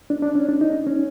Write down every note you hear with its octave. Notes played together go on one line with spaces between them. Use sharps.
D4
D4
C#4
D4
D#4
C#4